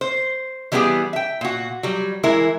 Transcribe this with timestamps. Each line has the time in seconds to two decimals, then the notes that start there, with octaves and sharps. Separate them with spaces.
0.01 C5
0.72 E3 G3 A#3 B3 G4 G#4
1.13 E5 G5
1.41 A#2 F#4
1.83 F#3 G3
2.23 E3 G#3 E4 A#4